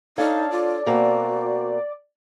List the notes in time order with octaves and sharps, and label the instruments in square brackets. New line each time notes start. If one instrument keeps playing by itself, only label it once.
[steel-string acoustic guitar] D4 A4 C#5 [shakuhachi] D#4 [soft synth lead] F5
[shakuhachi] F4 [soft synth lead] D5
[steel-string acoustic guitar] B2 A#3 C4 [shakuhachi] F#4